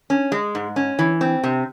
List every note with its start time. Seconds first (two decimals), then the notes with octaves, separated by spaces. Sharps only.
0.10 C#4
0.32 G#3
0.55 G#2
0.76 C#4
0.99 E3
1.21 C4
1.44 C3